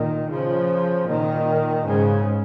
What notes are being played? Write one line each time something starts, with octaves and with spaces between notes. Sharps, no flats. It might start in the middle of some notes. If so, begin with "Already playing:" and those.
Already playing: A#2 D#3
C#3 F3
A#2 D#3
G#2 C#3